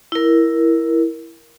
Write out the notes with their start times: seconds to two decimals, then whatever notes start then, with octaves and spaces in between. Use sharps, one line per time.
0.12 E4 A#4